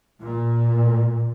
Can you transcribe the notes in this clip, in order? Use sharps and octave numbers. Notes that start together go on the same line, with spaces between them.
A#2